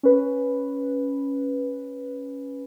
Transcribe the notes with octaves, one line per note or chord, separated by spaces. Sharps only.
C#4 B4